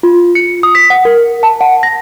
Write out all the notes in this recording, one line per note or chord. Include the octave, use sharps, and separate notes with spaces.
F4
C#7
D#6
B6
F#5
A#4
A5
F#5
A#6